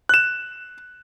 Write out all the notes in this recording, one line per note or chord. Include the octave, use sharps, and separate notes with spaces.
F#6 E7